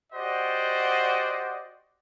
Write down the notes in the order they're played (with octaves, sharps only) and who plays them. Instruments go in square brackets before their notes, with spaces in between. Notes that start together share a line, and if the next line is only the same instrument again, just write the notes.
[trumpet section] F#4 G4 C5 D5 D#5 F#5